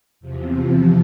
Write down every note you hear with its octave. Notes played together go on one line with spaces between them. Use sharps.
E2 C3 F3